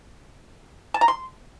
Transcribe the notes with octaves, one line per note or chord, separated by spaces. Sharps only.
A5
A#5
C6